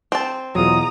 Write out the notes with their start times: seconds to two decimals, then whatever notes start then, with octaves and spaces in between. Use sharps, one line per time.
0.12 C4 A5
0.55 E2 B2 F#3 F4 A#5 D#6